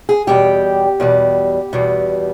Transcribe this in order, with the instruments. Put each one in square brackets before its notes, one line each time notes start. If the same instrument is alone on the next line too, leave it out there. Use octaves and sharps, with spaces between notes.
[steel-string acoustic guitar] G#4
E2 B2 G3 G4
E2 B2 G3
E2 B2 G3